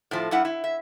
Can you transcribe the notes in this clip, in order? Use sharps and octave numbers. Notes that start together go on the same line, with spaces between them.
A2 F3
G2 G3 E4 F#5
E4
E5